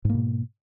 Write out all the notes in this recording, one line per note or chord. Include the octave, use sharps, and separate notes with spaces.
G#2 B2 A#3